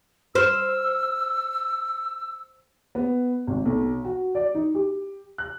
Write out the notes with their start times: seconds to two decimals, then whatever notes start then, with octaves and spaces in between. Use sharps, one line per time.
0.35 C5 E6 F6 E7
2.95 B3
3.47 G#1
3.65 B1
4.05 F#4
4.35 D5
4.55 D#4
4.75 G4
5.38 F#6